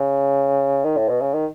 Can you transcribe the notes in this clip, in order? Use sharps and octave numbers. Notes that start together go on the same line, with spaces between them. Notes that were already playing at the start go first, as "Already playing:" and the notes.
Already playing: C#3
D#3
A2
B2
C#3
D#3